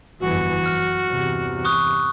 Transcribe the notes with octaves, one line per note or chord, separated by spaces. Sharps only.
G1 F2 E3 F#4
F#2 F6
E2 G2 C3
C#6 D#6 F#6